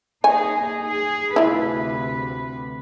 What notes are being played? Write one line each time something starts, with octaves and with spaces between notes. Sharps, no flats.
A#3 D#4 G#4 C#5 G#5
G#4
D2 C3 E4 F4 B4